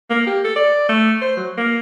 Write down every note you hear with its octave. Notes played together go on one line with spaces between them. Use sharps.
A#3
G4
A4
D5
A3
C5
F#3
A#3